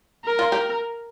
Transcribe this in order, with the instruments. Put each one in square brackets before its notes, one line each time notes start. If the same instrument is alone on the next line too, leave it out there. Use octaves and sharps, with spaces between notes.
[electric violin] A#4
[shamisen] F4
G4